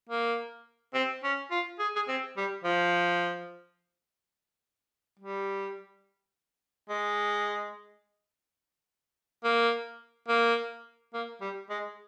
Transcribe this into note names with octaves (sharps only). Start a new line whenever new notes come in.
A#3
C4
C#4
F4
G#4
G#4
C4
G3
F3
G3
G#3
A#3
A#3
A#3
G3
G#3